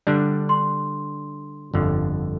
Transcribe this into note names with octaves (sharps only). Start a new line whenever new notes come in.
D3 G3 D4
C6
G1 F2 D3